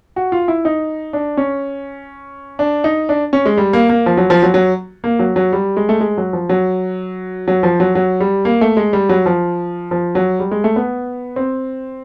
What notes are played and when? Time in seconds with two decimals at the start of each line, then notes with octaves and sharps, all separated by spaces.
0.16 F#4
0.32 F4
0.48 E4
0.65 D#4
1.13 D4
1.37 C#4
2.59 D4
2.84 D#4
3.09 D4
3.33 C#4
3.46 G#3
3.58 G3
3.73 A#3
3.89 A#3
4.06 F3
4.17 F#3
4.30 F3
4.42 F#3
4.54 F#3
5.04 A#3
5.19 F#3
5.36 F#3
5.53 G3
5.77 G#3
5.89 A3
6.00 G#3
6.18 F#3
6.33 F3
6.49 F#3
7.48 F#3
7.63 F3
7.80 F#3
7.95 F#3
8.20 G3
8.45 A#3
8.61 A3
8.77 G#3
8.93 G3
9.09 F#3
9.26 F3
9.91 F3
10.15 F#3
10.39 G3
10.51 G#3
10.64 A3
10.76 B3
11.36 C4